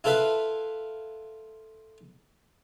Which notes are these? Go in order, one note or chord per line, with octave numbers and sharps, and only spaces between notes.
E4 F4 A4 B4 E5 F5